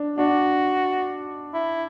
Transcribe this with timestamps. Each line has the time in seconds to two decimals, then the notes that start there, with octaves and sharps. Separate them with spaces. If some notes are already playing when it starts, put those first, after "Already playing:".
Already playing: D4
0.18 D4 F#4
1.54 E4